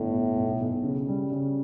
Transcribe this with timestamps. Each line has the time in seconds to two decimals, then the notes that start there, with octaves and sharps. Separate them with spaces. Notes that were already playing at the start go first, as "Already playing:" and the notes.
Already playing: G1 A2
0.13 B2
0.36 B1
0.60 B1
0.83 C#3
1.08 G3
1.32 C#3